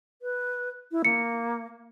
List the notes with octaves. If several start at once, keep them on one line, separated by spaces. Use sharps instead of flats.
B4
E4
A#3 C#7